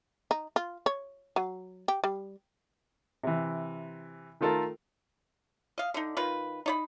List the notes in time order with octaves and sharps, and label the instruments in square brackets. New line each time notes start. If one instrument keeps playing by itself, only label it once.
[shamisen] D#4
F4
C#5
F#3
G4
G3
[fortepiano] C3 E3
D#3 A3 F4 A4 A#4
[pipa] D#5 F5
D3 D#4
D#3 F4 B4
D#4 C#5 B5